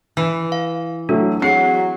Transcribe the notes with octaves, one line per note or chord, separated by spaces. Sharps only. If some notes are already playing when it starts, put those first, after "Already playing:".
E3
F5
F#3 A3 D4
F#3 C4 G#4 C7 C#7